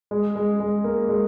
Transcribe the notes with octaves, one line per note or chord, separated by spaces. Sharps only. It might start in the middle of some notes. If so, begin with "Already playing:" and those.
G#3
G#3
G#3
A#3
G#3